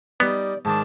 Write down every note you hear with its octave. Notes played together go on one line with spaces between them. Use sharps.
G3 B3 D#4 D5
G#2 D#3 D4 A5